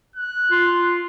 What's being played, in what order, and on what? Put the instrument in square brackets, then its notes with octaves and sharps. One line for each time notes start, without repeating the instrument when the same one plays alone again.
[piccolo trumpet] F#6
[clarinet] F4